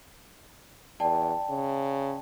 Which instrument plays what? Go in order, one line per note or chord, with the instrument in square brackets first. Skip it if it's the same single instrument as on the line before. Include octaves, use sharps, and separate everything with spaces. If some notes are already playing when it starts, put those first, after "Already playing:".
[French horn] E2 [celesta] D5 G5 A5
[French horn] C#3